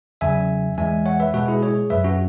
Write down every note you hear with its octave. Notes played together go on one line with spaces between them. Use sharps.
E2 C#3 F#3 E5 G#5
E2 E3 G#3 E5 G#5
C#5 F#5
B4 E5
B2 G#3 F#4 B4
E4 G#4
G#4 C#5
F#2 F#3 B4 E5
C#4 F#4